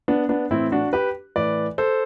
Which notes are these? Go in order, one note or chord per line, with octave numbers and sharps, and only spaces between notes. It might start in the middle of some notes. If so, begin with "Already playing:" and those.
B3 D4
B3 D4
A2 E3 C4 E4
D4 F#4
G4 B4
A2 E3 B4 D5
A4 C5